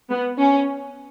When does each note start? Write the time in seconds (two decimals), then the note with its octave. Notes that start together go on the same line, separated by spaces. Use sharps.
0.10 B3
0.38 C#4